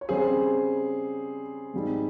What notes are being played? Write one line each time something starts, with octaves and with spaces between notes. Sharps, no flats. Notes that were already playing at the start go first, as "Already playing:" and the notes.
C#5
C#3 G3 C4 G#4 C5
G#2 G3 C4 D#4